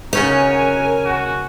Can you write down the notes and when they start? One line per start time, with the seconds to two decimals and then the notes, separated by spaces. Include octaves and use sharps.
0.13 C#3 C#4 D#4 F#4 A#4 C#5 G#5
1.05 F#4